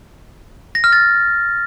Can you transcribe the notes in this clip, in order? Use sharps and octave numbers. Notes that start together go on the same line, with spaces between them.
A#6
F6
A6